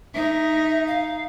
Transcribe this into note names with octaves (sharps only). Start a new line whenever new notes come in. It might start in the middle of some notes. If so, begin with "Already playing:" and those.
D#4 E5
F5